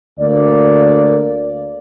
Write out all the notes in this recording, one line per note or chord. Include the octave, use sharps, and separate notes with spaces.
D2 A#3 D5